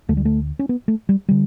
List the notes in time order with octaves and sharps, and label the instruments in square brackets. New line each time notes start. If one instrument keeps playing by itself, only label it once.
[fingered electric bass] D2 D3 A3
G3
A3
C#4
B3
A3
G3
D3 G3